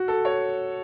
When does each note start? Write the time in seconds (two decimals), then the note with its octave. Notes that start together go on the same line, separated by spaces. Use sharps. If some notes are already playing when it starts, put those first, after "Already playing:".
Already playing: F#4
0.08 A4
0.25 C#5